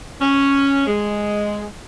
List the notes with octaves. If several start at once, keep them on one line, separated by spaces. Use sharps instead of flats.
C#4
G#3